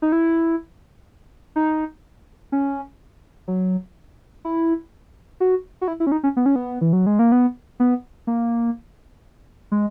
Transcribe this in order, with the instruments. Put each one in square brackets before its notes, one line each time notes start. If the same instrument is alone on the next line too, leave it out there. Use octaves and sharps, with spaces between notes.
[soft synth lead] D#4
E4
D#4
C#4
F#3
E4
F#4
F#4
E4
E4
C#4
D#4
C#4
B3
C#4
B3
E3
F#3
G#3
A#3
B3
B3
A#3
G#3